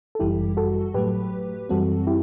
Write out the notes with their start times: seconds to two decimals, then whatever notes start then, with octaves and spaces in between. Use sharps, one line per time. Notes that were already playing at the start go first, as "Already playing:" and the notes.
0.15 A4
0.19 G1 F#2 E3 G3 E4 G4
0.57 F#4 A4
0.94 A2 F#3 A3 G4 B4
1.69 F#2 E3 G3 C4 F#4 A4
2.07 E4 G4